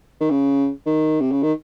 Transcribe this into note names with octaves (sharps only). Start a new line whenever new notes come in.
D#3
C#3
D#3
C3
C#3
D#3